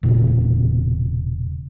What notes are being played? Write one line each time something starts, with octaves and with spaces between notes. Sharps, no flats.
E1 A#2 C#3